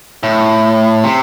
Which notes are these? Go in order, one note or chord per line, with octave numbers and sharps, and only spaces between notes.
A2
C3